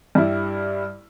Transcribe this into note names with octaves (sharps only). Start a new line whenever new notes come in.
G2 G3 E4